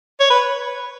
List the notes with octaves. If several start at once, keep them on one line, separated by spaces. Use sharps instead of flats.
C#5
B4